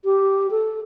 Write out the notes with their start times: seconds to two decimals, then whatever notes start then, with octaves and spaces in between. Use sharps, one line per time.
0.04 G4
0.50 A4